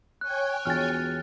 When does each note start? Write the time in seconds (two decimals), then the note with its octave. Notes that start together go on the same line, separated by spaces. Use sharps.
0.21 C#5 G5 G#5 F#6
0.66 E1 B2 F4 F6 A6